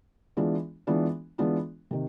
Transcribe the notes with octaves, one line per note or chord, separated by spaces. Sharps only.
E3 G#3 B3 D4 F4
E3 G#3 B3 D4 F4
E3 G#3 B3 D4 F4
C3 D#3